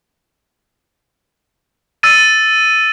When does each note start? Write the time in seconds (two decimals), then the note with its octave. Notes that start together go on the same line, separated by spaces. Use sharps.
2.03 E6 A6 D#7